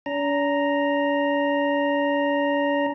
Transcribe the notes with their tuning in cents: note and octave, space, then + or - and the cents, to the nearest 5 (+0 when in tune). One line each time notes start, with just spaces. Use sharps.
D4 -45 A#5 +0